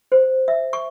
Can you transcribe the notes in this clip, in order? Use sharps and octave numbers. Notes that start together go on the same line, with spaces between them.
C5
E5
C#6